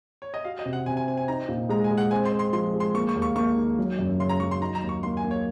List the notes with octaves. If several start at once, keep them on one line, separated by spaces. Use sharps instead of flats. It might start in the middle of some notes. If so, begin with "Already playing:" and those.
C#5
D#5
F#4 F5
D#5
C3
F#5
C3 G#5
G#5
C4 G#5
G#5
D#4 A#5
A#2
G#3 A#5
G#5
G#3
F#5
C4 G#5
C6
C4
C6
F3 C6
G#3
C6
A#3 C#6
C#6
D#2
C#6
A#3 C#6
D#3
F#3
F#2
C#3 C6
A#5
F#3 C#6
C6
D#4 A#5
A#5
D#2
C#6
A#3 C6
G#5
A#3
C#5